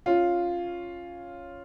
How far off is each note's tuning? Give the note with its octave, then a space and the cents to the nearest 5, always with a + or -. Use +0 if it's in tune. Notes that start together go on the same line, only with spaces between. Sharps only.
C#4 +0 F4 +0